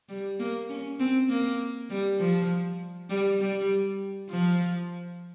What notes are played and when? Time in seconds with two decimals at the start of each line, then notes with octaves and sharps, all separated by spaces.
0.09 G3
0.39 A#3
0.69 C#4
1.00 C4
1.29 A#3
1.90 G3
2.19 F3
3.10 G3
3.39 G3
4.29 F3